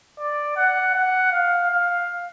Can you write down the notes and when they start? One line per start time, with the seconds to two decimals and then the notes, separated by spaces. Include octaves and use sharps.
0.20 D5
0.57 F#5
0.95 F#5
1.32 F5
1.70 F5